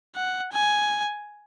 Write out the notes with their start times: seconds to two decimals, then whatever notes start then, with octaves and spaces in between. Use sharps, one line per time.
0.16 F#5
0.52 G#5